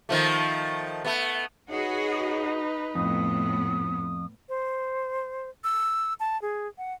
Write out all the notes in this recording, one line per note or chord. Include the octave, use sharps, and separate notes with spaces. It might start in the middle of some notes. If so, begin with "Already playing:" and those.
D#3 F3 A3
A3 B3
D#4 F#4 G#4 B4 C#5 D#5
F2 A2 B3 D#6
C5
E6
A5
G#4
F#5